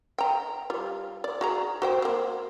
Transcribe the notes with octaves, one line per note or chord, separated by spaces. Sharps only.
G5 A#5
G3 F4
D5
F#4 G#4 A#5
F#4 C5 G5
A#3 C4